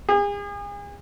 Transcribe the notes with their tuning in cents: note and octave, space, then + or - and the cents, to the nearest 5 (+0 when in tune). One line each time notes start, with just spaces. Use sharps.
G#4 -40